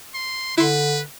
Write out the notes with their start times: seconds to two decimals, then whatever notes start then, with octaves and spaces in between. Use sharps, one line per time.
0.14 C6
0.58 D3 E4 B4 C6